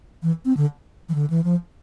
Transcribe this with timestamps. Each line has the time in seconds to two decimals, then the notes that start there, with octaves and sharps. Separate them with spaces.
0.23 E3
0.45 C4
0.57 D3
1.09 E3
1.15 D3
1.30 E3
1.44 F3